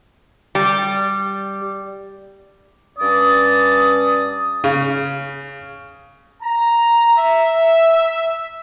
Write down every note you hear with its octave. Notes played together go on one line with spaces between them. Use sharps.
G3
G2 C#4 D5 D#6
C#3
A#5
E5